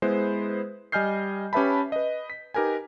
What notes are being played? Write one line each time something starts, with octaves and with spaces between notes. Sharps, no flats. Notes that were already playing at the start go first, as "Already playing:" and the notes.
G#3 B3 E4 B4 C5
G3 D#5 G#5 F6 G6 C7
C#4 G4 B4 E5 A5 B5
B4 D#5
B6
D#4 G4 A#4 B4 G#5